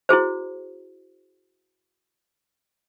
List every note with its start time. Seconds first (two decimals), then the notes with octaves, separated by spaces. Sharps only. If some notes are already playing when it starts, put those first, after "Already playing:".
0.09 E4 F#4 G#4 C5